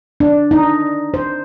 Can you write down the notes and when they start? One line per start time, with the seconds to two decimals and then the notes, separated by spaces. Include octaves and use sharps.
0.20 D4
0.51 D#4
1.14 C5